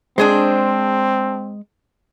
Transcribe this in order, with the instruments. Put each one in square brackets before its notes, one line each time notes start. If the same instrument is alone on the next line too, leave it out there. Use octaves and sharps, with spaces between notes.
[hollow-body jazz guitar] G#3 [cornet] C4 [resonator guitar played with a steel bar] D4 G#4 C5